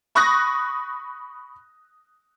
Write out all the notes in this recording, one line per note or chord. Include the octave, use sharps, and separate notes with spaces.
B5 C#6 D#6 F#6 A#6